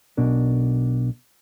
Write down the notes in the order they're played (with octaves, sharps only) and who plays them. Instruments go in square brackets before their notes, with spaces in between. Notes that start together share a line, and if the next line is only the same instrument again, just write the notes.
[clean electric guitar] B1 B2 D4 A#4